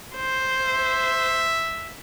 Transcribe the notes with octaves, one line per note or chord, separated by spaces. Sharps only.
C5
E5